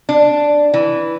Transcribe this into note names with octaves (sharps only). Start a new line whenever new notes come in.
D4
E3